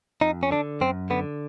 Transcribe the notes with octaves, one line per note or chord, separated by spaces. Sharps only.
F2 D#4
C#4
D3 D4
F#2 C4
D3 B3